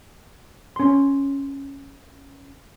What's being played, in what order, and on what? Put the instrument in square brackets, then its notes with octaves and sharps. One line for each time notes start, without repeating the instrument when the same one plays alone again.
[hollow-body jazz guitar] C#4 C6